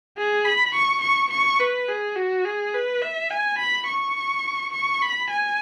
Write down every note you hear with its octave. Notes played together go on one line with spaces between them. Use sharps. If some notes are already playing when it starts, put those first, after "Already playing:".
G#4
B5
C#6
C#6
C#6
B4
G#4
F#4
G#4
B4
E5
G#5
B5
C#6
C#6
B5
G#5